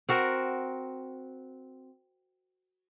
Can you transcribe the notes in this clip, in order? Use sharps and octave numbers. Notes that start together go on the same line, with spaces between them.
C4 F#4 A#4